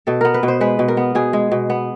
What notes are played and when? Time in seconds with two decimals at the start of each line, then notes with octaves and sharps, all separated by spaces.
0.07 B2 A4
0.21 B3 A#4
0.34 B4
0.43 B2
0.48 C5
0.61 G#3 B4
0.79 B2
0.88 A#4
0.97 B3
1.15 B2 G#4
1.33 G#3
1.52 B2
1.70 B3